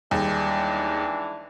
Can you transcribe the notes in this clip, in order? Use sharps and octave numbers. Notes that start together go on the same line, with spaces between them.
D#2 E3 G3 G#3 D4 D#4 G#4